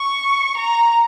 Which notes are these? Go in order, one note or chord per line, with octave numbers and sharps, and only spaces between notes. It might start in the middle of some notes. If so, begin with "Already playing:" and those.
Already playing: C#6
A#5